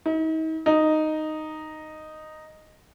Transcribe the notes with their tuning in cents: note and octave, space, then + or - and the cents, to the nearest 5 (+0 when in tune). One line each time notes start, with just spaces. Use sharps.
D#4 +40
D#4 -5